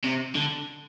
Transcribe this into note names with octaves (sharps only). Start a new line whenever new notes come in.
C3
D3